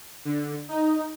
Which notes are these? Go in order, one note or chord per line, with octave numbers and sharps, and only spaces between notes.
D3
D#4